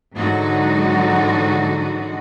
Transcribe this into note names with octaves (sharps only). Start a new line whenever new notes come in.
G#2 D3 E3 F#3 D#4 F#4